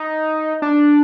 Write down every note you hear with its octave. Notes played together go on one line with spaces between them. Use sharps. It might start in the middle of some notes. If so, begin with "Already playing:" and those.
Already playing: D#4
D4